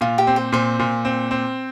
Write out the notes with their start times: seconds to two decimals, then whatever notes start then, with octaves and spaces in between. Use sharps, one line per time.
0.01 A#2 F4
0.18 G4
0.27 C4
0.36 C5
0.52 A#2 C5
0.79 A#2
1.05 C4
1.31 C4